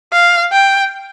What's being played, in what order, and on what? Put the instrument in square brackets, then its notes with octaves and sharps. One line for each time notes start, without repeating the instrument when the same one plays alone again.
[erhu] F5
G5